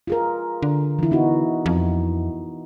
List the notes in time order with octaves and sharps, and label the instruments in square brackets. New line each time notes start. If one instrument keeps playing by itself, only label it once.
[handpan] F4 G#4 A#4
[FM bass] D3
[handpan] E3 E4
B3 D#4 F#4
[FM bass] F2